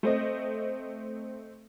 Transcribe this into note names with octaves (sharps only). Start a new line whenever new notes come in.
A3 C4 D#5